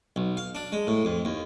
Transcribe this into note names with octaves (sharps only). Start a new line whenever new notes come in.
B1
F5
D4
G#3
A2
F2
D#2